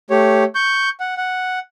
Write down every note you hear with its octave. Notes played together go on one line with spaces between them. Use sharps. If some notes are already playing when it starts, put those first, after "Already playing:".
A3 G4 C#5
C#6 G6
F#5
F#5